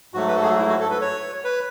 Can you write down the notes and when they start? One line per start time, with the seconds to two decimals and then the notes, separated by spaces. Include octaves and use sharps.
0.14 G#2 F#3 A3 F#4
0.28 B4
0.35 A4
0.42 G#4
0.50 F#4
0.58 E4
0.69 F#4
0.80 A4
0.90 B4
1.01 C#5
1.44 B4